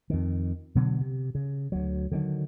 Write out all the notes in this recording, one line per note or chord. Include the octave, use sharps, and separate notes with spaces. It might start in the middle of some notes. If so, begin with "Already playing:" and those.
F2 D#3
B2 D3 F#3 B3
C3
C#3
D2 F#3
D3 D#3 F3 F#3